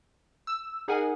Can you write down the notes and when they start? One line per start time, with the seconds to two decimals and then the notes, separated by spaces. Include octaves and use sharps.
0.47 E6
0.88 D#4 G#4 A#4 F#5 G#5